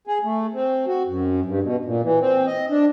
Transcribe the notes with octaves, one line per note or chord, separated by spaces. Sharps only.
G#4
A3
C4
F#4
F#2
G2
B2
A#2
E3
C4
D#5
D4